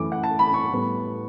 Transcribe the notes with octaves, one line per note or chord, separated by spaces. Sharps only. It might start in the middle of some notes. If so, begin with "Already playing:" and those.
Already playing: F#2 E3 A3 D6
F#5
A5
B5
C#6
A2 G3 B3